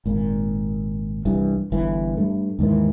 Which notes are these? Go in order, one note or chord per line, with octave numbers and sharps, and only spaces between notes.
G#1 A#2
C2 G2 E3
G1 E3
G2 A3
D#2 G#2 D#3 E3